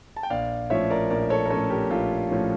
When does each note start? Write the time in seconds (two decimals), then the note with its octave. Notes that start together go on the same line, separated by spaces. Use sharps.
0.16 A5
0.23 G5
0.30 A#1 D5 F5
0.70 A2 F3 C#4 C#5 E5
0.90 A#4 D5
1.10 A#1 A#4 D5
1.30 A4 C#5
1.46 A#4
1.50 A2 F3 C#4 A4 C#5
1.70 G4 A#4
1.90 A#1 F4 A4
2.30 A2 F3 C#4